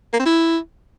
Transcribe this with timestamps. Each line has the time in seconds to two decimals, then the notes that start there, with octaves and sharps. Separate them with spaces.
0.13 A#3
0.19 C4
0.26 E4